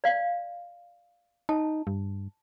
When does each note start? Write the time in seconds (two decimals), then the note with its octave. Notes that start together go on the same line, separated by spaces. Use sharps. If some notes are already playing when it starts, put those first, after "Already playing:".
0.04 D5 F5
1.49 D#4 A5
1.87 G2